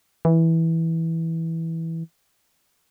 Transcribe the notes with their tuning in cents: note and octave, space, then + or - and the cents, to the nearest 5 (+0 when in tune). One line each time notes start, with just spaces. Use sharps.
E3 -10